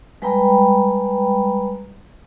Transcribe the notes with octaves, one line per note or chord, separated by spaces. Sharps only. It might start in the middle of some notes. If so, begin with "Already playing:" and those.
G3 G#3 B4 G5 A#5 B5